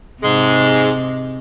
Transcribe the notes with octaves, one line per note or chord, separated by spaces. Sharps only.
G#2 C3 G#3